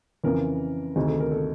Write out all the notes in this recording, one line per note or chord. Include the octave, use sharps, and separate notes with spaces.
F2 C#3 E3 A#4
D2 C3 D#3 G#4
A4
A#4
A4